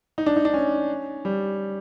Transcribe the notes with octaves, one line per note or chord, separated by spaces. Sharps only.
D#4
D4
D#4
D4
C#4
G3